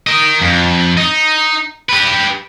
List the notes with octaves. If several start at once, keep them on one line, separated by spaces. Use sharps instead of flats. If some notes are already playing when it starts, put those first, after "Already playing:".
A#4 D#5
F2
D#4
G4 B4